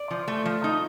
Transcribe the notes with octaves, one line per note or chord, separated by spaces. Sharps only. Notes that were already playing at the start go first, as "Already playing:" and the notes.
Already playing: D5
F3
A3
F3
D#4